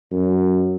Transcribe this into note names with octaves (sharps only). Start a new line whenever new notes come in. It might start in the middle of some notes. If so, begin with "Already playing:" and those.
F#2